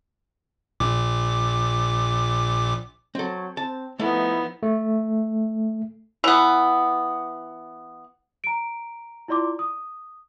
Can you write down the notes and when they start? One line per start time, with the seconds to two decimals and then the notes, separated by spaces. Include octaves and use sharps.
0.80 A#1 A#2 D6
3.15 F#3 C4 A4
3.57 C4 A5
3.99 F3 A3 B3 D#4 E4
4.63 A3
6.24 E3 B3
8.44 A#5 D7
9.28 E4 F4 D5 C6 D6
9.59 D#6